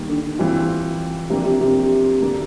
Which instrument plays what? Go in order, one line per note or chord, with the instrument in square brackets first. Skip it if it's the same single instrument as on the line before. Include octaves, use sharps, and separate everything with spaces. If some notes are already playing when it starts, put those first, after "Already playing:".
Already playing: [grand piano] D#2 D#3 G3
[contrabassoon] D3
[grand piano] E3 G3 C4 F4
[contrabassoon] C3 [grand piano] F3 A#3 D4 G4
[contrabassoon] C3
C3
[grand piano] D#2 D3 F#3 A#3 D4